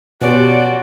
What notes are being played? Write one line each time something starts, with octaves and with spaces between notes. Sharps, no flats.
B2 F3 F#3 B3 C#4 F#4 G4 D5